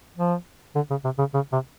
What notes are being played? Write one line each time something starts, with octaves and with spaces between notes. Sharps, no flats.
F3
D3
C#3
C3
C#3
C#3
C3